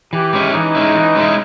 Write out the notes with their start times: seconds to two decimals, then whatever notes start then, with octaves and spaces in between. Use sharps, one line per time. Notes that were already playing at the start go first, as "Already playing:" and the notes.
0.13 E3 G4
0.33 G#3 C#4 E4
0.54 E3 D#4
0.75 G#3 C#4 E4
0.95 E3
1.15 G#3 C#4 E4